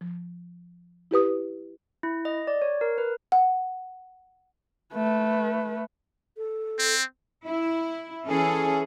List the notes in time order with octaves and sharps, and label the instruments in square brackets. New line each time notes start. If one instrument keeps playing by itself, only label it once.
[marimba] F3
E4 G4 B4 D#6
[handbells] E4
D#5
D5
C#5
A#4
B4
[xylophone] F#5
[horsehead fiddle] A3 B4
[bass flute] A4
[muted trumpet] C4
[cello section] E4
E3 C#4 G#4 A4